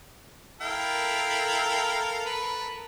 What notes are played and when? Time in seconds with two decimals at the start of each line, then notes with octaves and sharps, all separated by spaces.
0.61 E4 A4 A#4 F5 G5
2.26 B4